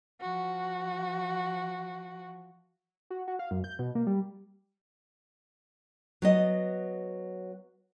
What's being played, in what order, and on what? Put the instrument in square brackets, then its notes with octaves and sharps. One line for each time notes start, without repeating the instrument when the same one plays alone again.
[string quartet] F3 F#4
[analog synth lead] F#4
F#4
F5
F#2
G6
B2
A#3
G3
[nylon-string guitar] F#3 B3 D#5